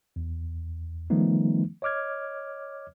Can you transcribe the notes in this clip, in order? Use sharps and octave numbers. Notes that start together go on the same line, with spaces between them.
E2
D#3 F3 G3 A3 B3 D#4
C#5 D#5 D6 F6 G#6